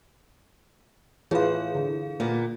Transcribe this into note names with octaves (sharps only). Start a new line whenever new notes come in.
A2 E3 F4 G#4 B4 F5
D3
A#2 A#3 B3